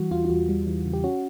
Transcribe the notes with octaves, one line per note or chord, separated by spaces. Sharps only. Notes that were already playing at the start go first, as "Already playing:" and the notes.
Already playing: E3 G3 F#4
E2 F4
F4
E2 F#4
G3
E3
C#3
G4
C#4 F#4